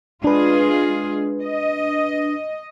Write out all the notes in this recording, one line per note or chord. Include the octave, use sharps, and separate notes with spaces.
G#3 D4 F4 G#4 B4
D#5